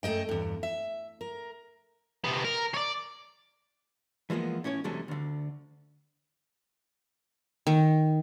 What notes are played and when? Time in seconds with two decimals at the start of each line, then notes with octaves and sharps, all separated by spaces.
0.03 F#2 A3 A#4 D#5 G5
0.29 E2 G2
0.63 E5
1.21 A#4
2.24 C3 B3
2.45 A#4
2.74 C#5 D5
4.30 E3 F3 G#3 A#3 B3
4.64 A2 C#4 E4 C#5
4.84 E2 C3 F#3 G#3 A3 D4
5.08 D2 D3
7.67 D#3